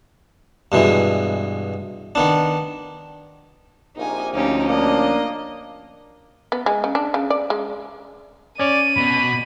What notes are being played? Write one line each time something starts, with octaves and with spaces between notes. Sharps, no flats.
G2 B2 E3 G#3
D#3 B3 D4
A#1 C3 A#3 D#4 G#5
D2 F3 C#4 D#4 G4
A#3 D4 D#5
B3
G#3
C#3
D4
C#3
D5
G#3
C#4 C#5 D5 D#7
B2 B5